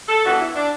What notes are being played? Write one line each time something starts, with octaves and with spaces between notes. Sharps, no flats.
A4
G2 E3 B3 F#4
E4
D4